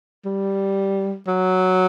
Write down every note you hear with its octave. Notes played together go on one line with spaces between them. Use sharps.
G3
F#3